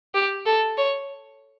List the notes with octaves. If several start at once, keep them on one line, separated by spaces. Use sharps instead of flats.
G4
A4
C#5